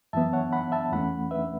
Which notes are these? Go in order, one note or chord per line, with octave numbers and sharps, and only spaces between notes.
F#2 E3 B3 E5 A5
C#5 F#5
F#5 B5
E5 A5
E2 E3 A3 C#4 F#5 B5
B4 E5